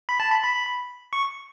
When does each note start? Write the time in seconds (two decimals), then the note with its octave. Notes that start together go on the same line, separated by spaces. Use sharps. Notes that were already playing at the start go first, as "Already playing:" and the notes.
0.09 B5
0.20 A5
0.31 B5
0.44 B5
1.13 C#6